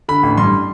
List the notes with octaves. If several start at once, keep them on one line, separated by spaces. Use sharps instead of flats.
D3 B5
A1
G2 C6